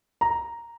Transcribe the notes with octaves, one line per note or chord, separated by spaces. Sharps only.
A#5